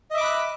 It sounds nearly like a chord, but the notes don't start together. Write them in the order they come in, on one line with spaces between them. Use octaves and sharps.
D#5 E5 D6 B5 F#6